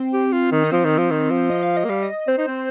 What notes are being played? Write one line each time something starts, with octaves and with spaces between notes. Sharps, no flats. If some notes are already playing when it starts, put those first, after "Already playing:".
Already playing: C4
G4
F4
D#3
D#4
F3 C4
D#3
F3
D#3
F3
D#5
F5
D#5
A#3
G3 F5
D#5
C4 C5
D#4
C4